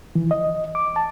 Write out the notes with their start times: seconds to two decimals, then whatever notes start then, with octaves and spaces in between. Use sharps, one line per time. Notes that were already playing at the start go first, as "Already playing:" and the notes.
0.15 E3
0.31 D#5
0.75 D6
0.96 A5